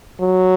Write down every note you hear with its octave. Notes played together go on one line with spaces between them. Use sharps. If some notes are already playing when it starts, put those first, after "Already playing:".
F#3